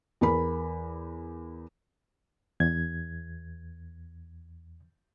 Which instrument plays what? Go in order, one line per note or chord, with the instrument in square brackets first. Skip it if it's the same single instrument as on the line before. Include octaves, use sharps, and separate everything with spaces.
[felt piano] E2 A#4 B5
[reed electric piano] E2 G#6